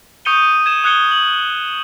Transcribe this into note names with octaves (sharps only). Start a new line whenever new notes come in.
C#6 D#6 G6 C#7 D#7 G7
G#6 E7
D#6 F#6 G#6 C#7 G7
F#7